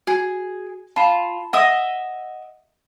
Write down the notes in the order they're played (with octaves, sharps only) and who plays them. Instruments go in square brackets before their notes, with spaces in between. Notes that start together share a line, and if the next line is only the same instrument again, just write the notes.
[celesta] F#4 [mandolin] G#4
[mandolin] F4 [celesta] A5 B5 E7
[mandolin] D#5 E5 D#6 [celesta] F#5